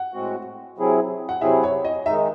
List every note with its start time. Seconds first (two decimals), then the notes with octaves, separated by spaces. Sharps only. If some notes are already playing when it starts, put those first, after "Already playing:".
Already playing: F#5
0.13 A2 G#3 C4 F#4
0.78 C3 F#3 C4 E4 G#4
1.29 F#5
1.41 C3 F#3 C4 E4 G#4 E5
1.63 C#5
1.85 D#5
2.06 D#3 G#3 D#4 E5